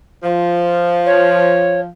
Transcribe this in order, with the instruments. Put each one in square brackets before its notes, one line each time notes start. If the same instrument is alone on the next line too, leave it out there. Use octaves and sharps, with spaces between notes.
[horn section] F3
[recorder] C#5